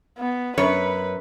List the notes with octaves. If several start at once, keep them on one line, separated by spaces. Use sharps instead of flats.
B3
F#2 B4 C#5